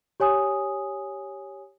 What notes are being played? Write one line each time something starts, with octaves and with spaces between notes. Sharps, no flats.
G4 C#5 G#5 D#6